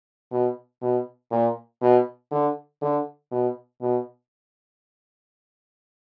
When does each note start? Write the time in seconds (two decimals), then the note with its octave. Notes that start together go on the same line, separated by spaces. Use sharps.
0.32 B2
0.82 B2
1.31 A#2
1.82 B2
2.31 D3
2.82 D3
3.32 B2
3.81 B2